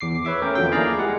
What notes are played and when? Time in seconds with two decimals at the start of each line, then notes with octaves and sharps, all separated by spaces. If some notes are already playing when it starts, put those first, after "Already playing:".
0.01 E2 D6 C7
0.25 B4 C#5 E5 D6
0.42 A3 C#4 A#4 G5
0.55 E2 D3 F3 F#3 C4 G5
0.71 A#3 E4 G#4 D5 F5 A#5
0.99 G3 G#3 F#5